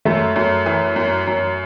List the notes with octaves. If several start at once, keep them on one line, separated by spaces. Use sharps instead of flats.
F#2 A3
F#2
E3
F#2
F#2